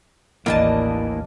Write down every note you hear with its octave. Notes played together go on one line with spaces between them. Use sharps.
A1 D#2 E3 A#3 D4 D#5 A5